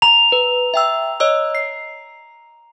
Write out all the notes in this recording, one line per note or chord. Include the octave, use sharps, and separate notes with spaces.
A#5 F7
B4
E5 G5 E6
C#5 D#5 E6
C7